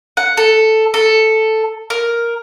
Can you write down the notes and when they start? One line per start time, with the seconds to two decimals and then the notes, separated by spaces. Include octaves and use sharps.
0.17 F#5
0.37 A4
0.94 A4
1.90 A#4